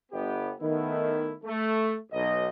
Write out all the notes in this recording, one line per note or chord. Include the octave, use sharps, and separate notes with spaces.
G1 B3 G4
D#3 A3 B3 E4
A3
B1 D#5